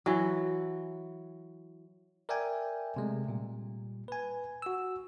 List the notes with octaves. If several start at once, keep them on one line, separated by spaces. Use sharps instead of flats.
E3 F#3
A#4 D5 E5 G5 G#5
C3 G#3 A3
A#2 G3
B4 G#5
F#4 E6